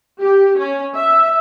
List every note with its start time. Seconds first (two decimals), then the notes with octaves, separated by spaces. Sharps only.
0.21 G4
0.58 C#4
0.96 E5